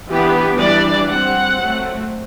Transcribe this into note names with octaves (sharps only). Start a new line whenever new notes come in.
E3 B3 D4 G4
E3 G3 D4 D5
G3 C4 F#5
F#3 A3 C4